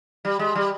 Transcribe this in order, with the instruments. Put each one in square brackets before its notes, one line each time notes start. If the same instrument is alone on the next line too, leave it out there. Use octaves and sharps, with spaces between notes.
[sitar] G3
G#3
G3